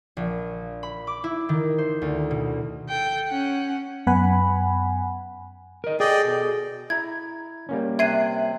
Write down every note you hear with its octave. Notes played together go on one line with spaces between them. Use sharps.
A#1
B5
D6
E4
D#3
C5
D2
B2
A4 G5
C#4 F#5
F#2 B3 F#5 G#5 B5
A#4 D#5
G#4 A4 D5 D#5 G5
B2
E4 A#5 G#6
G3 A#3 C#4
C3 E5 F#5 G#6 C7 D#7